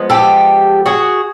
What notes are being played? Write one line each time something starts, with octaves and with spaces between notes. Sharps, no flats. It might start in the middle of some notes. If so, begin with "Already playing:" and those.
Already playing: F3 G#3 B3
G4 A4
F#4 G#4